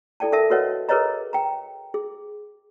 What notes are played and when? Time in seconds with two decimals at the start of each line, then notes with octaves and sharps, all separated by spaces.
0.20 E4 A4 D5 G5 A5
0.32 A4 A#4 E5 A5
0.50 F#4 A#4 B4 C#5 D#5 F#5
0.89 G#4 A#4 B4 C#5 D#5 A#5
1.33 G5 A#5
1.94 G#4